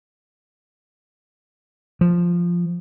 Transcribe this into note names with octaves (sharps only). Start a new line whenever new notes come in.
F3